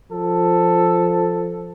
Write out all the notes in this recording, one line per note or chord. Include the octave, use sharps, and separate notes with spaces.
F3 A4